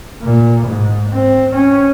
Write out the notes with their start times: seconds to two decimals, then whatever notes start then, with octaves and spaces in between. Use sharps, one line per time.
0.22 A#2
0.66 G#2
1.13 C4
1.55 C#4